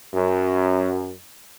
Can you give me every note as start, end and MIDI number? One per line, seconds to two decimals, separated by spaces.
0.13 1.14 42